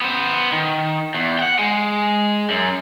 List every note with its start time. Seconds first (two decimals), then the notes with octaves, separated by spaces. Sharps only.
0.02 B3 C5
0.52 D#3
1.15 E2
1.39 F#5 G5
1.59 G#3
2.50 F#2